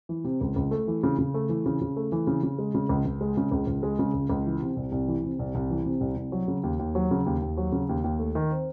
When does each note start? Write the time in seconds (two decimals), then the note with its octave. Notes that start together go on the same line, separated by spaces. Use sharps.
0.09 E3
0.24 C3
0.41 C#2
0.56 C#2
0.71 A3
0.88 E3
1.03 C#3
1.18 C#3
1.34 A3
1.49 E3
1.66 C#3
1.81 C#3
1.96 A3
2.12 E3
2.27 C#3
2.43 C#3
2.58 G#3
2.74 C#3
2.89 C#2
3.05 C#2
3.21 G#3
3.37 C#3
3.52 C#2
3.67 C#2
3.83 G#3
3.99 C#3
4.14 C#2
4.30 C#2
4.46 E3
4.61 C3
4.77 C2
4.92 C2
5.08 E3
5.24 C3
5.39 C2
5.55 C2
5.70 E3
5.86 C3
6.01 C2
6.17 C2
6.32 F#3
6.48 C#3
6.63 D#2
6.79 D#2
6.95 F#3
7.11 C#3
7.26 D#2
7.42 D#2
7.57 F#3
7.72 C#3
7.89 D#2
8.04 D#2
8.19 A3
8.35 D#3
8.51 C4